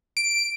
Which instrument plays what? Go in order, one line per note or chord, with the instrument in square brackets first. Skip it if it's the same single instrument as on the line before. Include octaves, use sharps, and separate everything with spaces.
[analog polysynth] D7